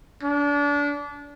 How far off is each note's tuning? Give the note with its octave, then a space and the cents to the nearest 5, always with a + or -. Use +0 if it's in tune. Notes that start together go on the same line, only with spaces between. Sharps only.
D4 -30